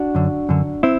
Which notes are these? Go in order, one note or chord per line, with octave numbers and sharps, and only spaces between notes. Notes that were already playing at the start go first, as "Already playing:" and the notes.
Already playing: D4 F#4
F#2 D3
F#2 D3
C4 E4